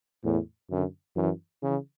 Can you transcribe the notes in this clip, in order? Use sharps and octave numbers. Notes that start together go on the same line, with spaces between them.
E2 A2
F#2 D3
F#2 E3
C#3 E3